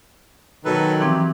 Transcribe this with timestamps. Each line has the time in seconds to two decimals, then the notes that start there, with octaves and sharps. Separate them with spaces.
0.65 B2 D#3 F#3 A4 B4
1.01 E3 F3 C4 G4